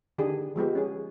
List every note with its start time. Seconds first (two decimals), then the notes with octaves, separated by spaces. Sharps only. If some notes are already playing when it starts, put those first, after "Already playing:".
0.18 D3 D#3 D4 G4 G#4
0.56 F3 G#3 B3 G4
0.75 C#4 G#4